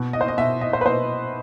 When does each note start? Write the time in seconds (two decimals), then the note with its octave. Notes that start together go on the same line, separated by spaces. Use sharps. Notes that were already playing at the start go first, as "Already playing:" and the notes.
Already playing: B2
0.13 D#5
0.21 C5
0.28 D#5
0.38 B2 E5
0.61 D#5
0.73 C5
0.81 B4
0.85 B2 C5